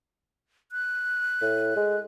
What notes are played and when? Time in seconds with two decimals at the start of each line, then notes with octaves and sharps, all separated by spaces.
0.72 F#6
1.42 A2
1.76 G#3